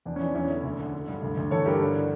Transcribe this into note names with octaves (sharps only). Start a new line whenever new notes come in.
E2 D4
C#4
E3 D4
E2 C#4 E4
D3
D2
D3
D3
G2
D2
D2
E3 A4 C#5
G2 G4 A#4
D3 D4